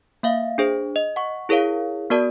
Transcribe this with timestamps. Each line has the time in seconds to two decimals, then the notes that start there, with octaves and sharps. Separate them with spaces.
0.23 A#3 E5 F5
0.58 D4 G#4 C5
0.96 D#5
1.16 F#5 C#6
1.49 E4 G#4 A#4 C#5 F5
2.10 B3 F#4 A#4 D5 A5